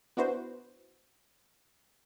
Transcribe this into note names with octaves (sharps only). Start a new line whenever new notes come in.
B3 D4 E4 F#4 B4 C5